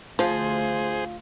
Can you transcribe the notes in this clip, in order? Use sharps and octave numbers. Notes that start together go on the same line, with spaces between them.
D2 F3 F4 G#4 C5